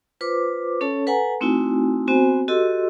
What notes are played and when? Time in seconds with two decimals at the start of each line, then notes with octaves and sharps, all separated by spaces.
0.21 F4 B4 C5 D6
0.81 C#4 A4 C#5 A5
1.06 A4 B4 F#5 G#5 A#5
1.41 A3 C4 D#4 E4 F#4 G#5
2.08 B3 C4 F#4 C5 G#5
2.48 F#4 G4 A4 D#5 C6 E6